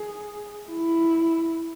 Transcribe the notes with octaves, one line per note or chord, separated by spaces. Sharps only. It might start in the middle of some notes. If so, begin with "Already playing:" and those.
Already playing: G#4
E4